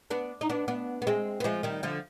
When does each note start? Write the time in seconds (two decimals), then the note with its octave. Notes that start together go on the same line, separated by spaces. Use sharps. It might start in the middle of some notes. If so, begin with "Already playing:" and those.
0.10 B3 D4
0.41 D#4
0.50 B3 D4
0.68 B3 D4
1.02 B3
1.07 G#3 C4
1.40 B3
1.44 F3 G#3
1.63 D#3 G3
1.83 D3 F3